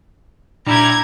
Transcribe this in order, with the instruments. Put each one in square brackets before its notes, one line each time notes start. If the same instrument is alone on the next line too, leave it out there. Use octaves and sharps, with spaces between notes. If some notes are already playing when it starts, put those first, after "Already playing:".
[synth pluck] A#2 D4 [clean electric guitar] G3 E4 G4 [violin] A#5 G#6